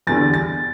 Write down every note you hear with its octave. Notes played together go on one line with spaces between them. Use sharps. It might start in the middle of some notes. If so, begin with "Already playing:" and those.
E2 D3 G3 A6
A6